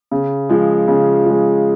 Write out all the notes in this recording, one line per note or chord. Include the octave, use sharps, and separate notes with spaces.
C#3
F3 G#3
C#3
F3 G#3